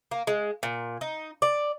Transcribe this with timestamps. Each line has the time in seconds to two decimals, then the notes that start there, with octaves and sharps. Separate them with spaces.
0.11 A#3
0.27 G#3
0.63 A#2
1.01 D#4
1.42 D5